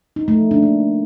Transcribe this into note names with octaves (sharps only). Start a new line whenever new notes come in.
D#4
A3
F3
D4
A#3